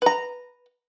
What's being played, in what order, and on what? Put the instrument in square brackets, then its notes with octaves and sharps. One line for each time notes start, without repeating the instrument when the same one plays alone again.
[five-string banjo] B4 A#5